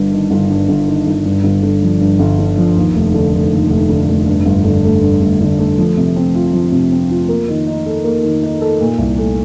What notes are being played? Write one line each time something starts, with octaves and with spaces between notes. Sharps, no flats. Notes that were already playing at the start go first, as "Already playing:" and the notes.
Already playing: G1 G2
D#3
G1
G2
G1
D#3
G1
G2
G1
D3
F3
G2
G1
D3
F3
D#2
F1
D3
F1
D#2
F1
D3
F1
G2
G1
D3
A3
G2
G1
D3
A3
F3
C3
C4
F4
F3
C3
C4
F4
A#3
D#3
D#4
A4
A#3
D#3
D#4
A4
A#2
C2
A3